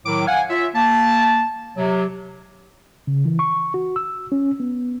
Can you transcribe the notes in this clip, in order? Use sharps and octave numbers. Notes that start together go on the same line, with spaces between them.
A2 D#3 F#3 D6
F5 F#5 G#5
F4 C#5 E5
A#3 A5
C3 F#3
C#3
E3
C#6
F#4
E6
C#4
B3